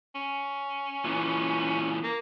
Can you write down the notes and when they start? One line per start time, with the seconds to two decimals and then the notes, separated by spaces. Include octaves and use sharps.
0.15 C#4
1.05 A#2 E3
2.04 A#3